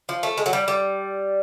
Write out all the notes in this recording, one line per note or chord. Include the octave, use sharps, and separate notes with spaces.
F3
A3
G#3
F#3
G3
G3